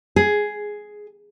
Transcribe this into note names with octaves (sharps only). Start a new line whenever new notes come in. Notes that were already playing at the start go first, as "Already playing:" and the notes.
G#4